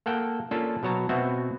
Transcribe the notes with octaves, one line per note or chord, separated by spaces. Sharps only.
A#3 A4 F#5 G5
A#3 C#4 D4 F4 A4
B2 F#3 C#5 A5 A#5
B2 B3 C4 F#4 E5